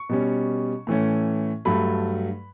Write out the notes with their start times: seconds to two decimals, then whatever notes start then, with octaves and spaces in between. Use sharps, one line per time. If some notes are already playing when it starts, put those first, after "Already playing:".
Already playing: C#6
0.09 B2 G3 C#4
0.87 A2 E3 A3 C#4
1.65 G2 F#3 A3 B5